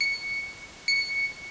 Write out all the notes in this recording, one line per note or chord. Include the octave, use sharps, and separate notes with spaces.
C#7
C#7